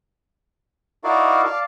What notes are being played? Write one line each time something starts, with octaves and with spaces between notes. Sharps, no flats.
D#4 E4 F#4 A#4 D5 F5
D5 F5 A5